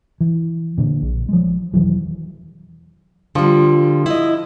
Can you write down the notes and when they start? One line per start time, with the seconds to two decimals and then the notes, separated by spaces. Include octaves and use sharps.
0.20 E3
0.78 A#2 D3
1.02 A#1
1.29 F3 G#3
1.74 E1 D#3 E3 F#3
3.35 D3 F3 G3
4.06 E4 D#5